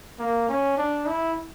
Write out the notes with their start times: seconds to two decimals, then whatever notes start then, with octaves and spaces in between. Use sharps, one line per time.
0.19 A#3
0.49 C#4
0.77 D4
1.06 E4